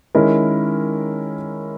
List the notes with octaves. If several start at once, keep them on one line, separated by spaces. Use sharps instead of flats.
D#3 G#3 C#4 E4 A#4